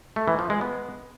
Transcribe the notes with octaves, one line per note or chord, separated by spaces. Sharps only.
A3
E3
F3
G#3
B3